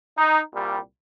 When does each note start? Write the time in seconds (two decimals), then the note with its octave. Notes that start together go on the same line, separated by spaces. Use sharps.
0.18 D#4
0.53 C2 A#2 G3